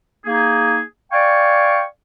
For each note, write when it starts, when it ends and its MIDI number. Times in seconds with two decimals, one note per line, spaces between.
0.25 0.81 58
0.25 0.81 63
0.25 0.81 68
1.11 1.82 74
1.11 1.82 77
1.11 1.82 79
1.11 1.82 80
1.11 1.82 85